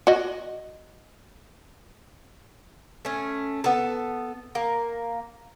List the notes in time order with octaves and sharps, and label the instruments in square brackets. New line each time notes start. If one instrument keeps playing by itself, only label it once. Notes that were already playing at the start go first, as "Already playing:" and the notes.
[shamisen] F#4 D#5
[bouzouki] A3 C#4
B3 A4
A#3